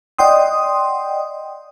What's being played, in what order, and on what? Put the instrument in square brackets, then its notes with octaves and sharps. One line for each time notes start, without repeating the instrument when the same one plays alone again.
[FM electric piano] D5 D#5 F#5 G5 C6 D#6